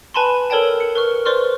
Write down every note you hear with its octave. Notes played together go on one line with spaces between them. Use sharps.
B4 G#5 A5 B5 C6
A4 A#4 C#5 D5 G5 A5
C#7
A#4 B4 C#6 F6
B4 C5 D5 C6 C#6 F6